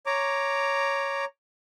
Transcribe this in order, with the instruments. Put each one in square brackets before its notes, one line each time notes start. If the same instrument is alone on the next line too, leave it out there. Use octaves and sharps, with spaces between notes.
[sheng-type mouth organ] C#5 A#5 D6